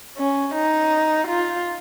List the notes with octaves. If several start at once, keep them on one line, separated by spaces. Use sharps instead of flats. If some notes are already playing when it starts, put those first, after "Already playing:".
C#4
D#4
F4